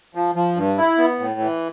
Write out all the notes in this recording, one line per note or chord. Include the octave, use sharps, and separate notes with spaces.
F3
F3
G2
E4
B3
A2
E3